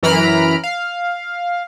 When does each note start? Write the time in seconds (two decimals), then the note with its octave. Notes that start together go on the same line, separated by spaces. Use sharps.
0.03 F#2 E3 A#5 B5 F6 D7
0.63 F5